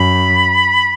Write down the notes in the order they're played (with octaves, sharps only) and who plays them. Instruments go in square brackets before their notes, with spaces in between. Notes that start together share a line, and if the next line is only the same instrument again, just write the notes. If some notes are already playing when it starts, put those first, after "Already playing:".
Already playing: [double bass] F#2 [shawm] B5